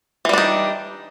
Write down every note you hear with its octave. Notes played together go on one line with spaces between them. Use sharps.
E3 G3 D4 D#4